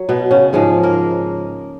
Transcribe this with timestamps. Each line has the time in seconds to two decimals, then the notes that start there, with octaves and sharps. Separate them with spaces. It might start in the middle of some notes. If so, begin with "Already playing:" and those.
Already playing: F#3
0.09 B2 B3
0.31 C#3 C#4
0.53 G#2 F3 G#3 G#4
0.83 A#3 A#4